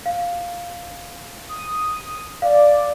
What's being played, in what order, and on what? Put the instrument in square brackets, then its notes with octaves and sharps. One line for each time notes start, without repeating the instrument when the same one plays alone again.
[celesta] F5
[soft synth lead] D#6
[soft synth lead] D5 [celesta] F5